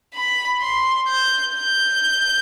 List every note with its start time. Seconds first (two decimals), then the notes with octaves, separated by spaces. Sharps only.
0.14 B5
0.61 C6
1.07 G6
1.55 G6